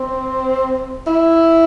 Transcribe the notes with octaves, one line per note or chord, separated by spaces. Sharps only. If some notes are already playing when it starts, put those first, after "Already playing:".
Already playing: C4
E4